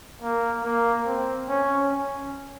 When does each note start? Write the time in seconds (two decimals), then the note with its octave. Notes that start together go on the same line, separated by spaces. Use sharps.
0.22 A#3
0.64 A#3
1.07 C4
1.49 C#4
1.91 C#4